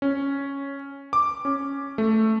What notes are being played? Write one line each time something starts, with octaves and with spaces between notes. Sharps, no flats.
C#4
D6
C#4
A3